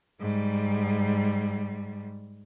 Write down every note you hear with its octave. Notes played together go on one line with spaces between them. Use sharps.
G#2 G3